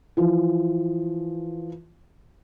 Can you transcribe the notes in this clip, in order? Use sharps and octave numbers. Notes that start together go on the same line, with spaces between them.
E3 F3